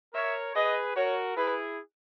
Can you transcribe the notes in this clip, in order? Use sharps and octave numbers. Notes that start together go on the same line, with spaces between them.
A#4 C#5 E5
G#4 B4 D#5
F#4 A#4 C#5
E4 G#4 B4